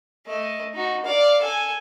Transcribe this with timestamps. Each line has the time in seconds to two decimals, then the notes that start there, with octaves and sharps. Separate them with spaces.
0.27 A3 D#5
0.74 D#4 F#4
1.05 D5 F5
1.42 A4 G#5